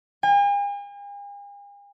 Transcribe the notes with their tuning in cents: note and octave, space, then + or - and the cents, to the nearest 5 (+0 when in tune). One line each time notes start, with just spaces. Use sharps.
G#5 -45